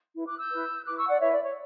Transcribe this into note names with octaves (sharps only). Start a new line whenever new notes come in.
E4 B4
D6 F#6
E6 G6
E4 B4
E4 B4 D6 F#6
C#6 E6
D5 F#5
E4 B4 C#5 E5
D5
C#5